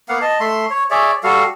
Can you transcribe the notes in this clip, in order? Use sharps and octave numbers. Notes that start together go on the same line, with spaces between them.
A#3 B3 F5 F#5
D#5 A5
A3 E5 C6
C#5
G#4 C#5 D5 E5
G3 F#4 A4 F5